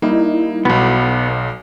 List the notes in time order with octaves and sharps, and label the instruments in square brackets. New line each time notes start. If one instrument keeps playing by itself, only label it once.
[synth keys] G3 D#4 E4 [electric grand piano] A#3
[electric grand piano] B1 B2 [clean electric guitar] B3